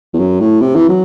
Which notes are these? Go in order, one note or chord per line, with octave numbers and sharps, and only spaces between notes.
E2
F#2
A2
C3
E3
F#3